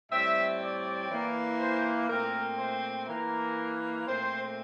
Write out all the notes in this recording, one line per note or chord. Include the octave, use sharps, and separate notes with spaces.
A2 G3 C4 E5
D5
E3 A#3
C5
A#2 A3 C4 A#4
C5
E3 A#3 A#4
A#2 A3 C4 C5